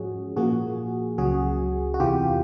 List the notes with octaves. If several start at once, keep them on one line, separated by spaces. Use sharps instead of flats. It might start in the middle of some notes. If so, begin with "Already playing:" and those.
Already playing: G#2 F3 G#3 C#4 F#4 G#4
A#2 F3 A#3 F#4 G#4
C#2 C#3 F#3 F#4 G#4
F#4
E2 C3 E3 F4 G4